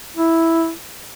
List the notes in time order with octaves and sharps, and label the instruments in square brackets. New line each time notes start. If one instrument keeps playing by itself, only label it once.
[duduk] E4